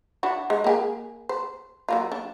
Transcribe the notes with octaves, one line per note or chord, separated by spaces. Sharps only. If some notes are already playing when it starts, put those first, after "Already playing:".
D4 E4 F#4
G#3
A#3 G4 G#4
C5
F#3 A#3 F4
D4